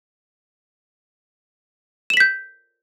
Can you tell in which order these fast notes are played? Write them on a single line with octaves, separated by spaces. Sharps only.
E7 F#7 B6 G6